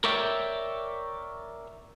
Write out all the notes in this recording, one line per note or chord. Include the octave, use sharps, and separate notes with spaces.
A#4 C#5 D5 E5 G5